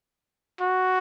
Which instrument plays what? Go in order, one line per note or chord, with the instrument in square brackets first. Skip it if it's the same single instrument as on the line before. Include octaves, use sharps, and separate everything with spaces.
[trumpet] F#4